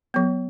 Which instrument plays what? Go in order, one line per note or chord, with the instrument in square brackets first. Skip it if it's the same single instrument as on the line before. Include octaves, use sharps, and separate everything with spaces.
[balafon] F#3 B3